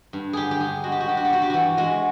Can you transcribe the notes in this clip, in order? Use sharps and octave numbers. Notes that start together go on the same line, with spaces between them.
G2
D3 G4 G#4
G4
G2 G#4
G#3 F#4
G4
F#4
G2 G4
F#4
G4
G2 F#4
G4
E3 F#4
G#3 F#4